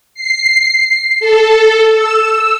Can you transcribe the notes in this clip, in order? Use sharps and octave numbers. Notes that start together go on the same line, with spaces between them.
C7
A4
E6